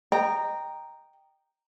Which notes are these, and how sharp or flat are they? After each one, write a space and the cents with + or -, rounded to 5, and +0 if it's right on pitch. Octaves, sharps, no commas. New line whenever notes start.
D#5 -20 G5 +0 A#5 +0